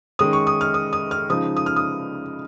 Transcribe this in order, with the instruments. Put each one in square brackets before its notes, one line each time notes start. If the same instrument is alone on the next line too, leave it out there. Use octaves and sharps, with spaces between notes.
[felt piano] D#3 G#3 C#4 D#6
C#6
D#6
F6
D#6
D#6
F6
C#3 F3 G#3 D#4 D#6
D#6
F6
D#6